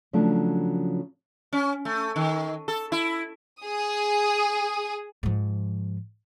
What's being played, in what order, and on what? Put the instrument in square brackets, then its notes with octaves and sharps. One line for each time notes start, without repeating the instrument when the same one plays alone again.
[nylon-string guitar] C#3 F3 F#3 A3 D4
[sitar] C#4
A3
D#3
A4
E4
[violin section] G#4 D#6
[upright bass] G#2 F3